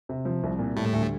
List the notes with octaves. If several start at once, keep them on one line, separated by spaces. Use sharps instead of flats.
C3
F3
C2
A#2
A2 G3 A3
D2